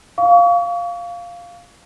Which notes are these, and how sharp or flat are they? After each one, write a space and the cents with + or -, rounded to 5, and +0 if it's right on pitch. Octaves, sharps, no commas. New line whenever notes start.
F5 +0 C#6 +35